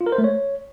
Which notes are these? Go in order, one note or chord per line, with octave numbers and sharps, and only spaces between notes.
F4
A#4
C5
A3
C#5